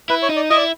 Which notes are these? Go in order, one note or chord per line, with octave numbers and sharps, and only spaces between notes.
E4 B4
C#5
D#4
D5
E4 D#5
D5